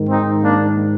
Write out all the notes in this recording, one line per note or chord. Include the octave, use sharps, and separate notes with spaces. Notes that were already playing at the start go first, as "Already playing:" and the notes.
Already playing: G#2 D#3
C4 D#4
A#3 D4